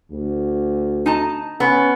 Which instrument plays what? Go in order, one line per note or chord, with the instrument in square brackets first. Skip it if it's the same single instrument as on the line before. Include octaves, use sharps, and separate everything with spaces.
[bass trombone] D2
[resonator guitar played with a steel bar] D#4 A5
[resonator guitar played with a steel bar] B3 [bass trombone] C#4